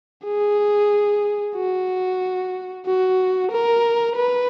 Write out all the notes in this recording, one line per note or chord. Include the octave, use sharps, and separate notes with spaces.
G#4
F#4
F#4
A#4
B4